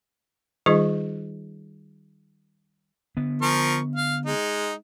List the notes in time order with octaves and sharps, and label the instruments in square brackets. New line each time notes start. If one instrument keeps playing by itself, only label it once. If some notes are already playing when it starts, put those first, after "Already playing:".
[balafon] D#3 G3 D#4 F4 G#4 D#5
[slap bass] D3 B3
[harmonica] F3 A#4 C#6
F5
G#3 D#4